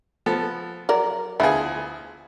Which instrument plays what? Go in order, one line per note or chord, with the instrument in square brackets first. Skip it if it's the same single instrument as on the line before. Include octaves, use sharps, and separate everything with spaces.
[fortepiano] F3 B3 A4
[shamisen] F#3 A#4 D5
[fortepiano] D2 G#4 [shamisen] F3 B3 E4